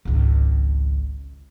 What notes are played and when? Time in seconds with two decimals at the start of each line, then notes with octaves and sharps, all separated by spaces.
0.05 G#1 C#2